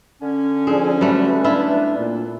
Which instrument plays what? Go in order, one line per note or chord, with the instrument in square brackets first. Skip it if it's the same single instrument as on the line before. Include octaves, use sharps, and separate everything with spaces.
[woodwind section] D3 C#4
[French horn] F3 [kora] C4 [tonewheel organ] D4 G#4
[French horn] F#3 [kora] G3 A3 [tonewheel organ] B4
[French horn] D4 [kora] E4 F4 E5
[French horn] A#2